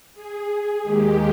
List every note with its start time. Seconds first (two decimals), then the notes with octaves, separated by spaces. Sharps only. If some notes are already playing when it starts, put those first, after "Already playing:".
0.15 G#4
0.82 D#2 D#3 G#3 G4